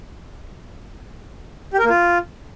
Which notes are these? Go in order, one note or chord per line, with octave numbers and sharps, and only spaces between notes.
G4
A#4
A#3
F4